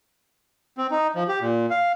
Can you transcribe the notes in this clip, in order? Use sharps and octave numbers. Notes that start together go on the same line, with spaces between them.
C4
D#4
F3
G4
A#2
F5